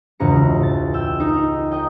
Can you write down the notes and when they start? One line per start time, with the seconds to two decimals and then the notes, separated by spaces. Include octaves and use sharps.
0.20 E1 C#2 G#2 A#5 C#7
0.63 A6
0.94 G5 E6
1.20 D#4 A#4
1.71 A#4 D#5 G5